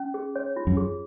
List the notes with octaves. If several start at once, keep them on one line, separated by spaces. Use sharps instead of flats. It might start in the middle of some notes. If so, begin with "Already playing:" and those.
Already playing: C#4
G#4
C#5
F4
F#2
G#4